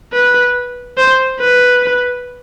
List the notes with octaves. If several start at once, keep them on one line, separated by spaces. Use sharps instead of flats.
B4
C5
B4